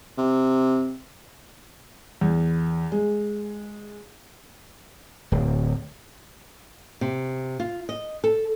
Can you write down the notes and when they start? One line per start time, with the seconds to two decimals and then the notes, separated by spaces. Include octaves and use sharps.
0.17 C3
2.21 E2
2.92 G#3
5.32 D1
7.01 C3
7.60 F4
7.89 D#5
8.24 A4